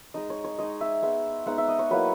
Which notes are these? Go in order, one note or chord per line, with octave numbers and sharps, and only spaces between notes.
G#3 D#4 D#5
C#5
C#5
G#3 D#4 D#5
E5
G#3 B3 D#4 E5
G#3 B3 D#4 F#5
E5
D#5
C#5
F#3 A#3 E4 B4